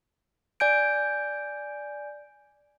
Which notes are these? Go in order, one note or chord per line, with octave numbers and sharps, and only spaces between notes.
D5 G#5 G6 D7